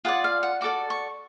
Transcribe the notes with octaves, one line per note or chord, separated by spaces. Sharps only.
F4 G#4 B4 D5 F#5
F5
F#5
F#4 A4 D5 D6
C#6